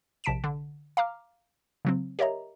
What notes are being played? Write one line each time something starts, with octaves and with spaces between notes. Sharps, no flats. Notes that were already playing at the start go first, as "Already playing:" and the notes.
A#1 C3 A5 B6 D7 E7
D3
F5 A#5 D6 F6
C#3 F#3 C4
G4 A#4 C#5 D#5 E5 A#5